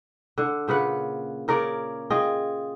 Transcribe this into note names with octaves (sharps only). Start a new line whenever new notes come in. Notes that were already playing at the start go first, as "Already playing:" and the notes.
D3
A#2 C#3 B4 F#5
C#3 A#4 C#5 D5
F4 G#4 D#5 G5